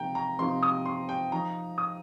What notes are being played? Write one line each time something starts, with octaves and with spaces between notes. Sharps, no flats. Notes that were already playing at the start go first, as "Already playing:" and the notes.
Already playing: C3 F3 A#3 D#4 G5 A#5
A#5
C3 F3 A#3 D#4 C6
D#6
C6
G5
F3 D#4 A#5
D#6